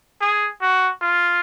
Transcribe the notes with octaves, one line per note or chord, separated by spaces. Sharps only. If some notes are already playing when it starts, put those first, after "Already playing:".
G#4
F#4
F4